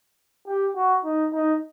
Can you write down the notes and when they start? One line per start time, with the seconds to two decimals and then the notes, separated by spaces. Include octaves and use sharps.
0.47 G4
0.76 F#4
1.04 D#4
1.33 D#4